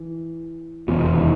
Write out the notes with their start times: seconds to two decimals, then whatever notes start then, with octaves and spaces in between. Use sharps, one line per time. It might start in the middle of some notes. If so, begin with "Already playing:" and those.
Already playing: E3
0.88 F1 E2 B2 F3
1.09 E3
1.16 D#3